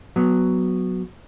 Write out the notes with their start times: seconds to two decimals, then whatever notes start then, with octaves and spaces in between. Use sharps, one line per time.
0.16 F#3 B3